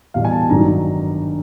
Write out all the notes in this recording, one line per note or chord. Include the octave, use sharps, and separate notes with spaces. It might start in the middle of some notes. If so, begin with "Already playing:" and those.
E2 B2 G3 F5
G#5
A5
G#1 G2 D#3 F#3 A#5